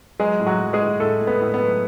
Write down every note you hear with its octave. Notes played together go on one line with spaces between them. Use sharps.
F#3 G#3 G#4
A2
F#3 F#4
F#3
G#3 G#4
A2
A2 A3 A4
A2
B3 B4
A2
B3 B4
F#3